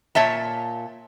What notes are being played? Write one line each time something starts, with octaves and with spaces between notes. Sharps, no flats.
A#2 C#5 E5 A5